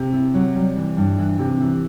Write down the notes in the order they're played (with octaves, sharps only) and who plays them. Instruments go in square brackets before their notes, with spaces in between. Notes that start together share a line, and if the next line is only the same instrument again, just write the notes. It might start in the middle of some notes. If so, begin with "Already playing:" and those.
Already playing: [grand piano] C3
[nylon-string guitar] E4
F#3
G3
E3
G2
E3
[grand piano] C3 [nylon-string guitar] E3
[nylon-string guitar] E3